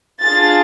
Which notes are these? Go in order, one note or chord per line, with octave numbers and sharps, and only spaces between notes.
D4 F4 G#4 A6